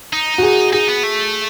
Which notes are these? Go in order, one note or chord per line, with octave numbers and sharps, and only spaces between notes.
D#4
F#4
G#4
D#4 G#4
B3
A3